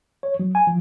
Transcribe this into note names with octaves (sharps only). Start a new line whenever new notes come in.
C#5
F#3
G#5
F3